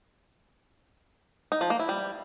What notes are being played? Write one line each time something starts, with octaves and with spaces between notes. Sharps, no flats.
D#4
F3
A#3
E4
G3